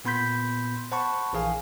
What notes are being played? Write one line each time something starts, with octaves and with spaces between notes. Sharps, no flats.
A#2 B3 B5 C6 G6 B6
C5 F#5 A5 B5 C#6
A#1 E3 G#4 F5 G#5